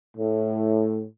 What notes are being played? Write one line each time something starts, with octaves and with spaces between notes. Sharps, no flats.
A2